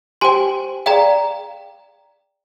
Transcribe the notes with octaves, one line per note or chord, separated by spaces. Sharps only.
G4 C5 G5 G#5 C6
G#4 D5 F5 G5 A#5